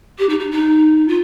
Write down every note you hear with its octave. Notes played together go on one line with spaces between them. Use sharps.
G4
D#4
D#4
D#4
F4